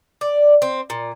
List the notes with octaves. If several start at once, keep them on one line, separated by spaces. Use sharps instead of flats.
D5
C4
A#2